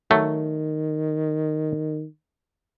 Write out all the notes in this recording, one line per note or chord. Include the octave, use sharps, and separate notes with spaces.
D#3 F#3 A3